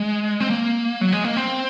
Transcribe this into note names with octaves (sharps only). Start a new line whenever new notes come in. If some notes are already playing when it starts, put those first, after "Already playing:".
Already playing: G#3
C4
A#3
F#3
G#3
A#3
C4